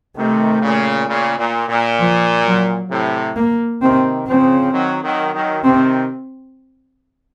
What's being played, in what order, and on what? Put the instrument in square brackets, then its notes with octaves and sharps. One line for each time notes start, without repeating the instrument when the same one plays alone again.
[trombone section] C3 D#3 [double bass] A3
[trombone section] A#2 C#3
A#2 C#3
A#2
A#2
[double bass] F3
F#3
[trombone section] A2 C3
[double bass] A#3
[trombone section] C3 D#3 [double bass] C4
[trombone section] C#3 F3 [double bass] C4
[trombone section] D#3 F#3
D#3 F#3
D#3 F#3
[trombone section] C3 D#3 [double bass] C4